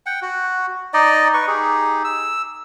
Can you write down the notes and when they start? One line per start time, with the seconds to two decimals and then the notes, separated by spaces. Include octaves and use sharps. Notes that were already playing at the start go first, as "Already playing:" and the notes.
0.06 F#5 G5
0.22 F#4
0.94 D#4 D5 D#5
1.34 B4 C#6
1.47 D#4 G4 G#4
2.04 E6